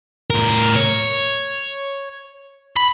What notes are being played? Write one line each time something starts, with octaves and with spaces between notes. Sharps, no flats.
A2 A#4
C#5
B5